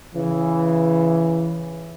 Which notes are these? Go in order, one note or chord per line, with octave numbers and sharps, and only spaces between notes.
C#3 E3